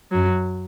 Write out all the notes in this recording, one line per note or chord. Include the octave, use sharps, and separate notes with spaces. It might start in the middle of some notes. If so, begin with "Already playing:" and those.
F#2 F#3